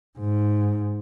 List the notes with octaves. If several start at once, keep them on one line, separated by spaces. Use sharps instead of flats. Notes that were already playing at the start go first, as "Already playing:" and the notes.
G#2